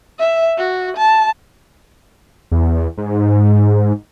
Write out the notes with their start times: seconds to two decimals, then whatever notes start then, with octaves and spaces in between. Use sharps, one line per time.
0.19 E5
0.58 F#4
0.97 A5
2.51 E2
2.98 G#2